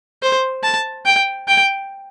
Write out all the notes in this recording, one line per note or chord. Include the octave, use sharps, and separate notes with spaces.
C5
A5
G5
G5